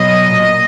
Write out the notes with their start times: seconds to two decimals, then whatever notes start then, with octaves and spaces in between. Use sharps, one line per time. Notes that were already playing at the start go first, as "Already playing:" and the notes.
Already playing: B2 F#3 D#5
0.35 A#2